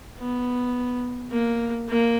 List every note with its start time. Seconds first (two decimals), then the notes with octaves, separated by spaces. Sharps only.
0.19 B3
1.32 A#3
1.89 A#3